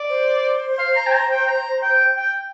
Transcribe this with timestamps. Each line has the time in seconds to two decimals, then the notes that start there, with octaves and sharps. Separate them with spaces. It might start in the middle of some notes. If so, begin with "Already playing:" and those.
Already playing: D5
0.09 C5
0.79 F5
0.96 A#5
1.07 G5
1.13 A#5
1.31 G5
1.48 A#5
1.83 G5
2.17 G5